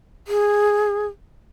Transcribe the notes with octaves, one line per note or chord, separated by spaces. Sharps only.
G#4